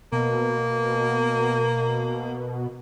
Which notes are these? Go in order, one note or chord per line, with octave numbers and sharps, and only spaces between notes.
B2 A#3